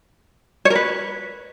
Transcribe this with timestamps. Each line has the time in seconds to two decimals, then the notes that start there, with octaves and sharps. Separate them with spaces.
0.65 C#5
0.70 A#4
0.75 B4